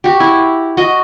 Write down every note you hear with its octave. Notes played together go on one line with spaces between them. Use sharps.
F#4 G4
E4
F#4 D#5